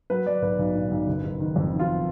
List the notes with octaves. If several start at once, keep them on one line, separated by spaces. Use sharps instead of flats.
F#3 B4
F#3 D5
B1 B4
B1
A#2
B1
F#1
F#1
D#3
F2
D#3
F4